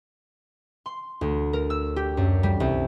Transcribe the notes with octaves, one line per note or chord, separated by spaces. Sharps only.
C6
D2
A#4
E6
G4
F#2
G3
C2